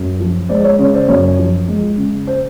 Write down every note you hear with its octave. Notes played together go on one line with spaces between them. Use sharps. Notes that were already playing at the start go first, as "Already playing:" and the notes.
Already playing: F#2
F3
G#3 C5 D5
C#5
C#3 C#5
C5 D5
F#2 C#5
F3
G#3
C#3
C5